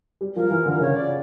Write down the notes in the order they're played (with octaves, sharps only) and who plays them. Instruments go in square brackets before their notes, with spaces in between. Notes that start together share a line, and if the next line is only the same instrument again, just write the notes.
[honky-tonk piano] G3
[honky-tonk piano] F3 [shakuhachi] A#4
[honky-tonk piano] E3
D3
[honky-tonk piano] C#3 [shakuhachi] C#5
[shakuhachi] D5